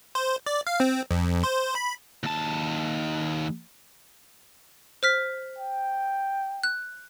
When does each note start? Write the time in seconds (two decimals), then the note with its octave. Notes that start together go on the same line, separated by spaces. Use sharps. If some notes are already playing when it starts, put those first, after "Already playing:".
0.15 C5
0.46 D5
0.67 F5
0.80 C4
1.11 F2
1.44 C5
1.75 B5
2.24 D#2 A5
5.03 C5 F6 B6
5.58 G5
6.64 F#6